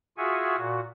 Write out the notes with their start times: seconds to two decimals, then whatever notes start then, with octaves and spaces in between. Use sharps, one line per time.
0.17 F4 F#4 G#4 E5 F#5 G#5
0.57 A#2 F#4